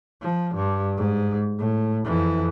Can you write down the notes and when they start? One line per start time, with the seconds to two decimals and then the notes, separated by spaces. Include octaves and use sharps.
0.22 F3
0.55 G2
0.97 G#2
1.59 A2
2.05 F2 E3